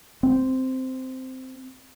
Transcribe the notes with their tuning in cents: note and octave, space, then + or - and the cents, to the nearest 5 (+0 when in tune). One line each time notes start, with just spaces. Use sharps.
C4 -10